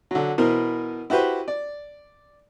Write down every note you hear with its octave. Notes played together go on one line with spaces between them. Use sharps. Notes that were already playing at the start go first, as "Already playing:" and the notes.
D3 F#3
B2 E3 A#4 C5
E4 F#4 G4 B4 C5
D5